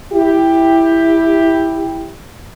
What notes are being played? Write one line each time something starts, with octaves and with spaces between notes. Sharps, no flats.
E4 G4